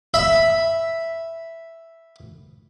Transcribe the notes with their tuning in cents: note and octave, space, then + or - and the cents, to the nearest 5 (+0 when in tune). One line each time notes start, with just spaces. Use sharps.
E5 +0 B5 +0